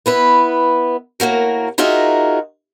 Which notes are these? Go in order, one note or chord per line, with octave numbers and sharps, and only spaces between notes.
B3 E4 B4
A2 A#3 F#4 A#4
D#4 F4 F#4 G#4 A#4 E5